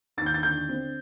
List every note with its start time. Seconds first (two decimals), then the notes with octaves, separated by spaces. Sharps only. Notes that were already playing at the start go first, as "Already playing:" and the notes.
0.17 D#2 A6
0.26 G6
0.34 A6
0.43 D3 G6
0.69 C4